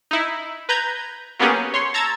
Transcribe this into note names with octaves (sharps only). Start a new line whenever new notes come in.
D#4 E4
B4 A#5 G6 G#6
F#3 A#3 B3 C#4 G4 G#4
C#5 C6
A5 A#5 E6 G#6 A6